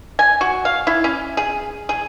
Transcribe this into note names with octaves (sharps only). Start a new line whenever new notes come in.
G#5
F#4
F5
E4
C#4
G#4
G#4